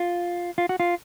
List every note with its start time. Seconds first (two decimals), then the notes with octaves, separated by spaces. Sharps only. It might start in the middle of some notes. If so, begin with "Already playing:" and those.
Already playing: F4
0.58 F4
0.69 F#4
0.80 F4